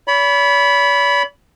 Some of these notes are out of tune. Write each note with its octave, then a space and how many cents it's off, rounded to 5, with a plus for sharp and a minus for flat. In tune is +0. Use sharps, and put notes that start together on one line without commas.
C#5 +45 B5 +0